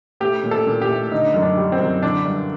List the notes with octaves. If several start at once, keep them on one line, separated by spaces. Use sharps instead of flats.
A3 G4
A#2
A4
A#2
G4
A3
D3 D#4
F#2
D4
G3
C4
F#2
D3 D4
G2